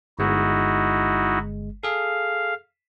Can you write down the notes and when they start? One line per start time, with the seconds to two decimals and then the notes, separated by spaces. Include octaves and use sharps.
0.19 G1 G#3 D#4 E4 F#4
1.83 G#4 A4 F5